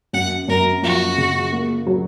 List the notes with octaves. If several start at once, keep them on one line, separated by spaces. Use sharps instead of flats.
F#2 F#5
F#2 A#4
F3 F#4
C#3
A#3
F#3